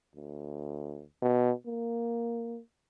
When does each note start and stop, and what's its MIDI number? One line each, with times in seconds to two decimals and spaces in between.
0.16 1.03 38
1.22 1.52 47
1.66 2.60 58